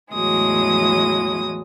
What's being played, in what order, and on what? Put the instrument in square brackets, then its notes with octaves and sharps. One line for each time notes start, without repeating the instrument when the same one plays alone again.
[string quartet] E2 A2 E3 F#3 G#3 D#6